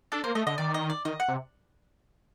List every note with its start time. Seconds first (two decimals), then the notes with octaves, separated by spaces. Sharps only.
0.12 D4 A4
0.24 A#3 C5
0.35 A3 D#5
0.47 D3 D#5
0.58 D#3 D5
0.74 D#5
0.90 D5
1.05 D#3 D#5
1.20 F#5
1.28 C3